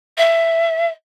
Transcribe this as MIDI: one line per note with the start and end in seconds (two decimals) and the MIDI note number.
0.18 0.89 76